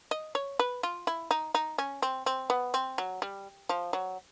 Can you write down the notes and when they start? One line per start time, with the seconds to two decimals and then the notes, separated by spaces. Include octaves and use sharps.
0.11 D#5
0.35 C#5
0.59 B4
0.83 F4
1.07 E4
1.31 D#4
1.55 D#4
1.78 C#4
2.02 C4
2.26 C4
2.50 B3
2.74 C4
2.98 F#3
3.22 G3
3.69 F3
3.93 F#3